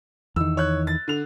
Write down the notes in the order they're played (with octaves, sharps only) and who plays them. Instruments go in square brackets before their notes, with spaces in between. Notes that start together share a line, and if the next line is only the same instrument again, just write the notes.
[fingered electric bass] E2 D#3 [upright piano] E6
[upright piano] C#5 F#6
A6
D3 F7